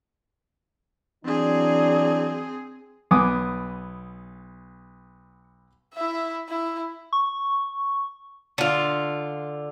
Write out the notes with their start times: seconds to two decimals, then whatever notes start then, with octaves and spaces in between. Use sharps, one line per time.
1.25 E3 F#3 C4 D4 G#4
3.11 B1 B3 G#5 D6 D#6
5.94 E4 E5
6.49 E4
7.13 C#6
8.58 D3 F4